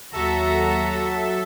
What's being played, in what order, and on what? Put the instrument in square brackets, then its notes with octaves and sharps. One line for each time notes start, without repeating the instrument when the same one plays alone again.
[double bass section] D#2 [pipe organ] F#3 [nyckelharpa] F#4 A#5 [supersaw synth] A4 E5